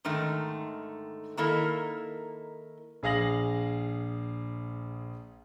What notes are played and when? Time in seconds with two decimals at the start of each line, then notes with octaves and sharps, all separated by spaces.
0.05 G#2 D3 D#3 A3
1.37 D#3 A#3 E4 A4 A#4
3.03 A#1 G#4 F5 A#6 F#7